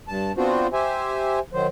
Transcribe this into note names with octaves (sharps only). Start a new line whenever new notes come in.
G2 A5
B3 C4 D4 F4 F#4 C5
G4 C5 E5 G#5
D#3 F#3 C5